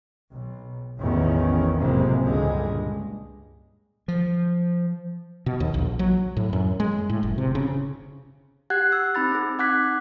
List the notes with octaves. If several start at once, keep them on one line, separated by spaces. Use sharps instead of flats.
B1
A1 E2 D#3 C#4
F#1 F2 A2 C3 G#3 A#3
C#2 G2 A#2 D3 G#3
F3
B2
D#2
A#1
F#3
A2
F#2
G#3
A2
F#1
C3
C#3
G4 F#5 F#6 G#6
E6
C4 D#4 B5 A6
C4 G#4
D#4 F#5 D6 F#6 G#6 B6